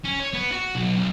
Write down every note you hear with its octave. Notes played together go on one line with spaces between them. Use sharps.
C#4
C#5
B3
F#4
B1
B1